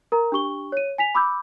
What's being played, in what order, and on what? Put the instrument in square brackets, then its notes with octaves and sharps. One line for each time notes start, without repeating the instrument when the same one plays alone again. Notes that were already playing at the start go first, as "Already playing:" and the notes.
[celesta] A#4 A#5
D4 G4 C#6 G7
C#5 D#7
G#5 B6 F7
B5 D6 E6 G6